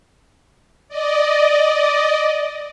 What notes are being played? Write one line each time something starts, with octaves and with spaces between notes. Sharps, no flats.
D5 D#5